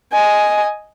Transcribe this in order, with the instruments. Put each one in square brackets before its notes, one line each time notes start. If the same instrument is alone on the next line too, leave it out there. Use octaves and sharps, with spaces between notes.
[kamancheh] D#5 G#5